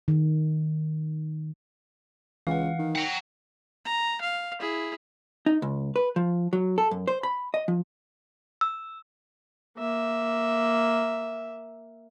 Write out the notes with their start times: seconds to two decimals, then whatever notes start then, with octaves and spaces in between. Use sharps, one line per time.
0.08 D#3
2.47 C#2 E3 F5 F#5
2.79 D#3
2.95 F#5 G5 A#5
3.85 A#5
4.21 F5
4.60 E4 G#4
5.46 D#4
5.62 C#2
5.96 B4
6.16 F3
6.53 F#3
6.78 A4
6.91 F#2
7.08 C5
7.23 B5
7.54 D#5
7.68 F3
8.61 E6
9.78 A#3 E5